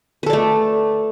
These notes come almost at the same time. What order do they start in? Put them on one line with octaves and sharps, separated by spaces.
B4 A4 D5 A3